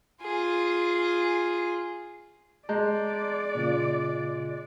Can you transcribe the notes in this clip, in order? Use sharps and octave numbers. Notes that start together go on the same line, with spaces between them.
F4 G#4
G#3 D5 A5 A#5 G6
A#2 C#3 F4